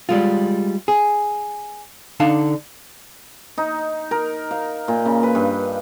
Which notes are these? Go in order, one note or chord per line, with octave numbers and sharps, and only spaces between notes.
G3 G#3 F4
G#4
D3 D4 D#4 F5 A5
D#4
A#4
F5
A#2
C#3
B4
G2